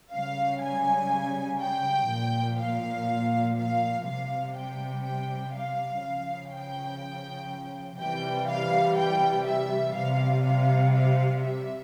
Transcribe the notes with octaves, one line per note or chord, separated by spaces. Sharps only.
C#3 G3 F5
G#5
G5
A#2 F3
F5
F5
C3 G3 F5
G5
G5
F5
C#3 F3
G5
C3 E3 G3 G5
F5
G5
E5
C3 G3 F5
F5
F5
E5